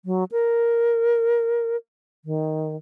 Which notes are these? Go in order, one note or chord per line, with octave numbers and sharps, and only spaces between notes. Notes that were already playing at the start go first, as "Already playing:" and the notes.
F#3
A#4
D#3